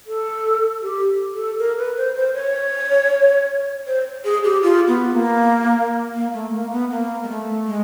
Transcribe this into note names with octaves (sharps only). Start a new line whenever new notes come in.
A4
G4
A4
A#4
B4
C5
C5
C#5
C5
G#4
G4
F4
B3
A#3
A#3
A3
A#3
B3
A#3
G#3
A3
G#3